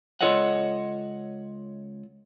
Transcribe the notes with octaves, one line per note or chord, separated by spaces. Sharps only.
C#2 F4 A4 C#5 D#5 F#5